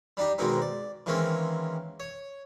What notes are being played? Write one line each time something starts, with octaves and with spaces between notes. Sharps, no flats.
G3 D4 D#4 G4
G#2 B2 D#3 G#3 C4 D#4
D5
D#3 E3 G#3 A#3 C4 C#4
C#5